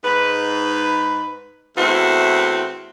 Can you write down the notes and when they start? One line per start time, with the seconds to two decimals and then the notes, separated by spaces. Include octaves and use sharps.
0.04 G#2 B4
1.77 E2 A2 C4 E4 F#4